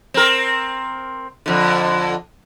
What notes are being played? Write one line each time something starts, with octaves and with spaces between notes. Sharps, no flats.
C4 A#4
F2 D3